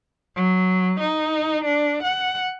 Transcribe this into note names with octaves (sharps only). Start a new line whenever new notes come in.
F#3
D#4
D4
F#5